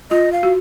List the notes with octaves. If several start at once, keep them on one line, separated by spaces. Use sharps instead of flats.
F4 D#5
F5
F#4